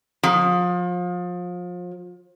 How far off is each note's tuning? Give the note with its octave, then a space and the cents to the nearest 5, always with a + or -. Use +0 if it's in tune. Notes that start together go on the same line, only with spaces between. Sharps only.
F3 +30